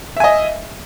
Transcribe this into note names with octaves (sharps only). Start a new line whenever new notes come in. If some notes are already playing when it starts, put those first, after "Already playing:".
D#5 E5 G#5